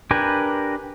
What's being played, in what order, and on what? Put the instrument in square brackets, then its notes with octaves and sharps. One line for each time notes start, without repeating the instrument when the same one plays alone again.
[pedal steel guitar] D4 G4 A#4 B4 G#5